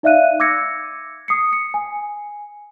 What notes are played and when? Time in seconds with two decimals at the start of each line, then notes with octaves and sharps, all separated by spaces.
0.03 D#4 D5 E5 F5 F#6 D#7
0.40 D6 E6 G#6 A#6 C#7
1.28 D#6 C7 C#7
1.53 C#7
1.74 G#5